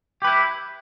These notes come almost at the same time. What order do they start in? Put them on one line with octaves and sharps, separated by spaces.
G4 B4 E4